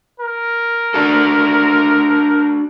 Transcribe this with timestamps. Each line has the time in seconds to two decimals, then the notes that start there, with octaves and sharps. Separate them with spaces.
0.20 A#4
0.94 D4 F#4 A4